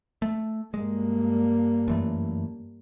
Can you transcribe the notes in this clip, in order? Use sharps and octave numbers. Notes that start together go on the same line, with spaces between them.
A3
G2 G#3 A#3
F#2 E3 A3